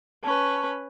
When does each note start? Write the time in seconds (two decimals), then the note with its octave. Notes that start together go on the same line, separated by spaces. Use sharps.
0.24 C#4 B4 A5 C#6